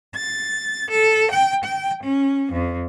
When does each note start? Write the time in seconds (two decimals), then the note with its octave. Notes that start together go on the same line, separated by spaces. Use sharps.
0.15 A6
0.91 A4
1.31 G5
1.64 G5
2.01 C#4
2.52 F2